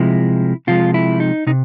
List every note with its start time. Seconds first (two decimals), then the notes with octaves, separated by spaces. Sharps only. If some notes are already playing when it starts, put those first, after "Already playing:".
Already playing: C3 F3 G#3 E4
0.67 C3 F3 G#3 F4
0.94 E4
1.20 D#4
1.47 C3 D#4